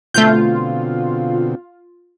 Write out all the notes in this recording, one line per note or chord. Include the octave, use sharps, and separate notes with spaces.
B2 D3 A3 C4 F4 G6